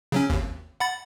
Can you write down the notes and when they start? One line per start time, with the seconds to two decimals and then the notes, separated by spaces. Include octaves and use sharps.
0.12 C#3 F#3 C#4
0.30 G#1 D#2
0.80 F#5 B5 A6